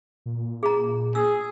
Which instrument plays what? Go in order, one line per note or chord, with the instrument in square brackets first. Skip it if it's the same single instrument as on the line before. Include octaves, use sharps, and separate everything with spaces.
[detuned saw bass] A#2
[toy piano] G#4 A#5
[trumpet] G#4 [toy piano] E6